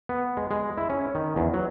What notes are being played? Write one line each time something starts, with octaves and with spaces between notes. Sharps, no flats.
B3
G#3
G#3
E4
C#4
D#3
E2
F#3